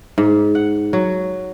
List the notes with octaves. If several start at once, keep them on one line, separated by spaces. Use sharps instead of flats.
G#2
F#5
F#3